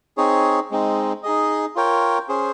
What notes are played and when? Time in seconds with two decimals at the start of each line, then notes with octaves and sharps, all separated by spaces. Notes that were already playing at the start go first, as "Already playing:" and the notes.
0.17 C4 D#4 G#4 C#5
0.71 G#3 C4 D#4
1.23 D#4 G#4 D#5
1.76 F4 A#4 C#5 G5
2.29 C#4 G#4 C5